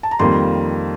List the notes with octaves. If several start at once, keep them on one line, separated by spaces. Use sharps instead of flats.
A5
A#5
F2 D#3 G3 A#3 C6